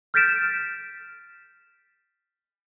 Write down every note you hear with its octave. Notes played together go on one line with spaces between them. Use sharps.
F6 G6 A6 B6 D7 E7